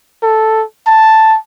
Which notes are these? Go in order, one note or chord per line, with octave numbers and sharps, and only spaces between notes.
A4
A5